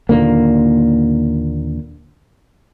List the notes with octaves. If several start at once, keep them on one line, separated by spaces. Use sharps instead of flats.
D#2 A#2 D3 A#3